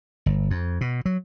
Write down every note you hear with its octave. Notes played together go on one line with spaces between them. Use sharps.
G1
F2
B2
F#3